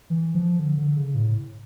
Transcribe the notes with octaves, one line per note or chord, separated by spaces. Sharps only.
E3
F3
D3
D3
C#3
A2